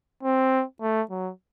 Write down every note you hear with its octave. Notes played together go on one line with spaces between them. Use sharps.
C4
A3
F#3